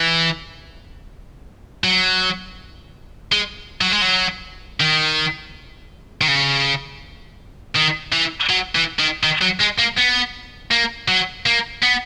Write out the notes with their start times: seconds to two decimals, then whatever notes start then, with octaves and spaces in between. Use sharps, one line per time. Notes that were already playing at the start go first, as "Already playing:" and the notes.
Already playing: E3
1.84 F#3
3.32 G#3
3.81 F#3
3.92 G#3
4.02 F#3
4.80 D#3
6.21 D#3
6.28 C#3
7.76 D#3
8.13 E3
8.49 F#3
8.75 E3
8.99 D#3
9.24 D#3
9.42 F#3
9.61 G#3
9.79 A#3
9.98 B3
10.71 A#3
11.08 F#3
11.46 A#3
11.82 B3